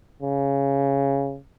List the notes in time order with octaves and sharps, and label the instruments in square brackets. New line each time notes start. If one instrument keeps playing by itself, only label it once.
[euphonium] C#3